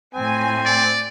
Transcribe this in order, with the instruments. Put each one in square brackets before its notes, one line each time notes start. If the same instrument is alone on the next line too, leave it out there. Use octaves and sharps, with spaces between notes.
[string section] A2 G#5 [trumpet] C4
[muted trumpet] D5